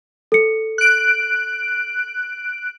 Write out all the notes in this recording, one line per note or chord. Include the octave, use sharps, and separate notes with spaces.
A4 C#7
F#6 D7